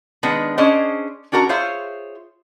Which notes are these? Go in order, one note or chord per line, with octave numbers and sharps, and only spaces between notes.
D#3 G#3 B3 D4
C#4 D4 G#4 C5 D#5
C#4 D4 F#4 A#4 A#5
F4 G#4 C5 C#5 E5 F5